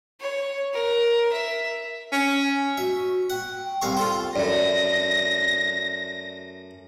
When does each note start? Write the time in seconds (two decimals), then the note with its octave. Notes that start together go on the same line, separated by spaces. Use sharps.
0.20 C#5
0.73 A#4
1.32 E5
2.12 C#4
2.78 F#4 E5
3.30 F#5 G5
3.82 C2 F5 C#6
3.97 F4 A4 C5
4.36 F#2 A3 F#4 D5 A#6